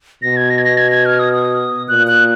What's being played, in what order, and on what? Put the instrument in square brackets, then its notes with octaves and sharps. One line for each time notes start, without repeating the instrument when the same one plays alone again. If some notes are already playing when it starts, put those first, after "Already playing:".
[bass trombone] B2 [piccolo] A#6
[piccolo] G#6
A#6
G#6
A#6
G#6
G#6
F6
D#6
D#6
[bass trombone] A#2 [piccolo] F#6
[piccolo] F#6